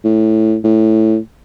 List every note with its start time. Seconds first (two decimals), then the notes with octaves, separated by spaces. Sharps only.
0.04 A2
0.64 A2